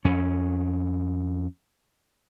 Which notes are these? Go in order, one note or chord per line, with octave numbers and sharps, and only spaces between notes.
F2 C#4